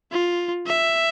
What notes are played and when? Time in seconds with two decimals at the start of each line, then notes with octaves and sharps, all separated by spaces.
0.11 F4
0.67 E5